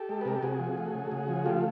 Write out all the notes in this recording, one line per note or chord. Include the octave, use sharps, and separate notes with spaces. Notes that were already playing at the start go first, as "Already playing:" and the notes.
Already playing: G4 A4
G#3
B4
C3 A#4
A4
C3 F#4 G#4
F3
A3
C#3
C#3
F3
A3 F4 G4